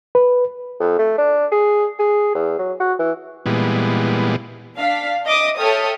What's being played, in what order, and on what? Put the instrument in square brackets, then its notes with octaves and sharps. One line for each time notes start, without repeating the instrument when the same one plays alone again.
[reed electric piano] B4
[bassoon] F2
A3
D4
G#4
G#4
E2
F#3
F#4
E3
[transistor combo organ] A#2 E3 G3 G#3 B3
[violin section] D4 F5 B6
D#5 E5 D6 D#6
A4 C#5 E5 G5 D#6 F6